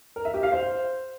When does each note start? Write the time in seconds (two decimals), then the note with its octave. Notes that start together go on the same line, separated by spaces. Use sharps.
0.16 A#4
0.25 E5
0.34 G4
0.43 F5
0.52 C5